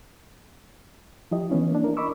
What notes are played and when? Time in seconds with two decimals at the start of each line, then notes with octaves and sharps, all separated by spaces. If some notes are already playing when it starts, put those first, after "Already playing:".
1.31 F3 E4 G4 D#5
1.50 E3 B3 C#4 E4
1.71 A#3 D4
1.84 E4 A#4
1.97 D#5 B5 C#6 D6 E6